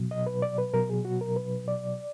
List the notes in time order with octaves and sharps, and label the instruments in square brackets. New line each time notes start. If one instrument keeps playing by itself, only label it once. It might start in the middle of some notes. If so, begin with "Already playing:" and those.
Already playing: [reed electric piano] B2 F#3
D#5
B4
D5
B4
B2 F#3 A#4
G#4
F#4
A#4
B4
D5